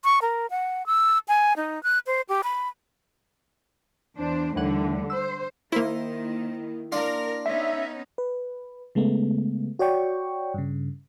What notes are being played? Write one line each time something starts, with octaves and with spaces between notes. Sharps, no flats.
C#6
A#4
F#5
E6
G#5
D#4
F#6
C5
G4
B5
E2 D4 C5
D#2 D3 E3 G3 A3 F#5
C5 E6
D#3 A#3 E4 C5
D4 A#4 F5 C6
B3 C#4 D#4 E5
B4
C#3 G#3 A3 B3
F#4 C#5 D5 G5 C#6
G2 C#3